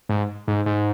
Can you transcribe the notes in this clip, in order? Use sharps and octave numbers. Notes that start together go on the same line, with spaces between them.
G#2
G#2
G#2